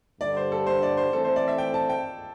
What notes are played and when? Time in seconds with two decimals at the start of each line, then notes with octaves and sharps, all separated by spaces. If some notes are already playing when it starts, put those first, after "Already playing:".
0.21 G2 D3 G3 D5
0.37 C5
0.52 A4
0.67 C5
0.83 D5
0.97 C5
1.12 E3 A3 C4 A4
1.24 C5
1.36 D5
1.48 E5
1.58 G5
1.74 A5
1.89 G5